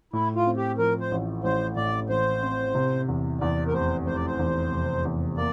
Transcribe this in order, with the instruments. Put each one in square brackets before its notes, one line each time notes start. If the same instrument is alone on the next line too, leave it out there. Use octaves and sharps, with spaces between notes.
[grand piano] A2 [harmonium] E4
[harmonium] F4
[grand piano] C4
[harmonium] G4
[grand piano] F3 [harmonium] A#4
[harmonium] C5
[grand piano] A1
[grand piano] A1 [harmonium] C5
[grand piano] A2 [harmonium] D5
[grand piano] A1 [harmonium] C5
[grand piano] C4
C3
E2
[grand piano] E2 [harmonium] D5
[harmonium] A#4
[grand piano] F1 [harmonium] C5
[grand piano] F1 [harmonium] C5
[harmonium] D5
C5
[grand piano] E2
F1
E2
[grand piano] A#3 [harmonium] D5